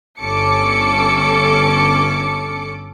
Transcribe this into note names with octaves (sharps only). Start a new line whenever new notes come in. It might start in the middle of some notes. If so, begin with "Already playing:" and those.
G1 C#4 A4 D6 C#7